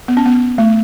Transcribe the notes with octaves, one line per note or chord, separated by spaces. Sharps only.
B3
C#4
B3
A3